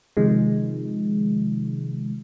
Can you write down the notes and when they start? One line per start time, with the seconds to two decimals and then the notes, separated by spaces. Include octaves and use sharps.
0.17 C3 D#3 F3 G#3